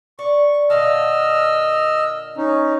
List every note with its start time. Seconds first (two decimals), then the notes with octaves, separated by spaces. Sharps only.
0.19 D5 C#6
0.70 A#2 D3 D#5 A5 E6 F6
2.37 C#4 D#4